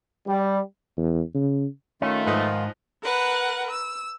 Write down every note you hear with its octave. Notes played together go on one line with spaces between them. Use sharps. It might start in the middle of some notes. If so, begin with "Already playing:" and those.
G3
E2
C#3
D#3 A3 C#4 F4
G#2 F3 D#4 B4
A#4 B4 F#5
E6